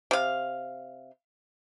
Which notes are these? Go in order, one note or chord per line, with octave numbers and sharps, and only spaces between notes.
C3 F5